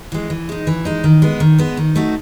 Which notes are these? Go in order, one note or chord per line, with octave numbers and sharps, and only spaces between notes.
E3 G#3
E3
G#3 D#4
E3
G#3 D#4
D#3
G#3 B3
D#3
G#3 B3
D#3
A3 D#4 F#4